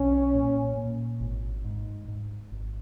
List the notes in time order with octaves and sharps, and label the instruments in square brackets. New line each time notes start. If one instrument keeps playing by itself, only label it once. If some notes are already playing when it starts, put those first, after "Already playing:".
Already playing: [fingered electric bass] B1 [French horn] C#4
[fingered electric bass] A#2
A#2
G#1
G#2
G#2
G#1